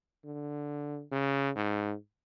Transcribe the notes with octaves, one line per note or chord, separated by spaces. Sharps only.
D3
C#3
G#2